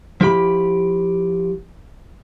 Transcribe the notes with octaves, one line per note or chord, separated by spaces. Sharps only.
F3 E4 G4 B5